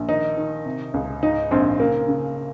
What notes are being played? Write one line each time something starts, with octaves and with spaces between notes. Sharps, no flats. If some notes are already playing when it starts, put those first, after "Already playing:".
Already playing: A#1
D#3 D#4
D#3
C3
C#2
G#2 D#4
A#1 C4
C#3 A#3
C#3